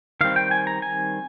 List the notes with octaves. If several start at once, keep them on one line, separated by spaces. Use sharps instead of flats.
D#3 G3 C4 F5
G5
G#5
A#5
G#5